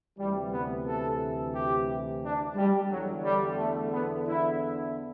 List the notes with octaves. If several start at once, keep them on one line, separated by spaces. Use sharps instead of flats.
D2 C3 E3 G3
B3
A4
G4
D4
G3
E2 D3 F#3
G3
A3
B3
E4